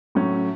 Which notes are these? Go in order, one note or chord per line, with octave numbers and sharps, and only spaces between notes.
A2 F#3 A3 C#4